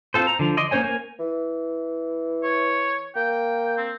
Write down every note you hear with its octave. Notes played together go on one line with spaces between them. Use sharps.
C4 F4 A4 C5
A#5
D3 F3
D5 D#5 C6
A#3 C#4 C5 C#5 G#5
A#3 A#4 G#5
E3
C#5
A#3 G5
C4